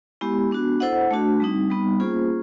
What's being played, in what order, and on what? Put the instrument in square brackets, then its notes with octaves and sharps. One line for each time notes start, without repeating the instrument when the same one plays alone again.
[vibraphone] G#3 B3 E4 G4
B3 D4 F#4
E4 A4 C5 D#5 F#5
A3 D4 F#4
G3 C4 D#4
G3 B3 D#4
A#3 C#4 F4 G#4 C5